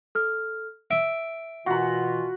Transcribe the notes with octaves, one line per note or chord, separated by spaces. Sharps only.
A4 F6
E5 D7
B2 E3 F4 F#4 F#5 B5